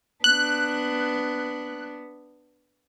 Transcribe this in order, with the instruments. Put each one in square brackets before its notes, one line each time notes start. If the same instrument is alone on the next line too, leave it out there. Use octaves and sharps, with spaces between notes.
[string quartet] B3 D4 [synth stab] F#6